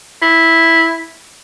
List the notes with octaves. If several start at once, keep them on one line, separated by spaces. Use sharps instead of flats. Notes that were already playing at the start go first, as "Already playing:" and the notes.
E4